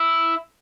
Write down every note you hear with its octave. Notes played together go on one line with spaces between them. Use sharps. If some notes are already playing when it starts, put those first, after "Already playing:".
Already playing: E4